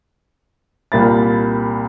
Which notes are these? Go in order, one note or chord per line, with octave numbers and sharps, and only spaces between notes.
C2 A#2 A#3 B5 A6